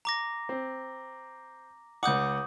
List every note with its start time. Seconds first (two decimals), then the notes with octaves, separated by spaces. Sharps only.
0.05 A#5 D6 A#6
0.49 C4
2.03 C#2 F#5 D6 D#6 G6